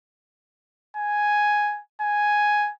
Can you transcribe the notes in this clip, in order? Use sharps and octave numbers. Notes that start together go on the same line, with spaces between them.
G#5
G#5